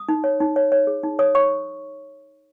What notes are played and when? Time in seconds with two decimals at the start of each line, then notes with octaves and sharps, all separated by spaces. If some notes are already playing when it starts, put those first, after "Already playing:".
Already playing: D#6
0.09 D#4
0.24 C#5
0.40 D#4
0.56 C#5
0.72 C#5
0.87 G#4
1.03 D#4
1.19 C#5 D#6
1.35 C#5 C#6